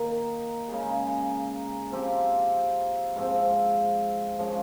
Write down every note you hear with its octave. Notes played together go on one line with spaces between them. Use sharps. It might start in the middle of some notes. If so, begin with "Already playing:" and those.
Already playing: D#3 A#3 D#4
C#3 G#3 D#4 G#4
F3 C4 G4
G#2 F3 C4
F3 G#3 C#4